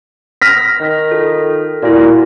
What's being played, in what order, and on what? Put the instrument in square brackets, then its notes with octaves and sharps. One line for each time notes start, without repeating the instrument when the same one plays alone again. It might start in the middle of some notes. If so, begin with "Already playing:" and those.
[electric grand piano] F6 A#6 B6
[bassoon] D#3
[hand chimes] F4 A4
[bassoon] A#2 [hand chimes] E4 F#4